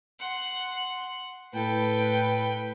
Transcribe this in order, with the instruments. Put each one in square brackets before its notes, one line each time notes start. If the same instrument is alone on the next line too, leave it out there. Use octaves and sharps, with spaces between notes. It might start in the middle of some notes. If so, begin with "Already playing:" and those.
[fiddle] F#5 C6
[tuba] A2 [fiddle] A4 [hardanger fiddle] B4 G5